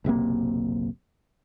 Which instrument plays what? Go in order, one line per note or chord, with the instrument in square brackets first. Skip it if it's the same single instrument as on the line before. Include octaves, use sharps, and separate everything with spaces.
[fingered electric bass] F#1 B1 C3 A#3